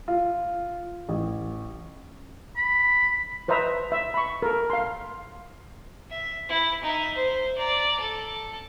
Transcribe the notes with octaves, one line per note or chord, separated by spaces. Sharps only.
F4
A1
B5
B4 C5 D#5 E5 A#5
E5
B5 C#6
A4 A#4
F5 C6
E5
E4
D#4 E5
C5
D5 A#5
A4